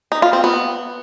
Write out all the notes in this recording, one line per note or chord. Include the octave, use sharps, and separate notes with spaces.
D#4
F4
C4
B3